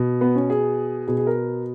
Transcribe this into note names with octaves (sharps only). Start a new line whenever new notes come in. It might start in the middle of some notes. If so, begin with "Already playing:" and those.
Already playing: B2
B3
C#4
G#4
B2 G#4
G#4
A#4